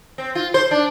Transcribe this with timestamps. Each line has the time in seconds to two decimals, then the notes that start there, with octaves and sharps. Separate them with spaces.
0.18 C4
0.35 F4
0.54 C5
0.71 D4